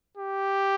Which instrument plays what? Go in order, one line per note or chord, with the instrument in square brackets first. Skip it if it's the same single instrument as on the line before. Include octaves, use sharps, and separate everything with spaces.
[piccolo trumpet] G4